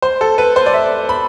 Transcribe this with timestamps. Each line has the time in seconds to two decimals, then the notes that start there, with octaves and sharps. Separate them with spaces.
0.02 C5
0.21 A4
0.38 B4
0.56 C5
0.66 D5
0.74 E5
1.09 B5